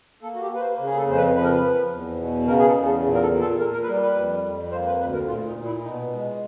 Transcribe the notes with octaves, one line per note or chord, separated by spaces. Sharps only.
A#3 A4
F#4
G4
A#3 B4
C5
C#3
G#4
A4
F2 C5
B4
F3 B4
A#4
B4
F3
E2
B2
C#3 A#4
G#4
A4
E2
A4
A#2
A#4
A4
A#2
A4
A#2 A#4
A#4
B4
G3 A#4
B4
F2
F2
A#3 C5
B4
D2 B4
A#4
A#2 F4
D#4
A#2
E4
B2 D#4
G#3